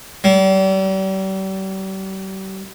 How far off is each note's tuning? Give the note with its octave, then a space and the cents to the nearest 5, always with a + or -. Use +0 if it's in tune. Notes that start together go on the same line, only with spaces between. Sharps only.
G3 -40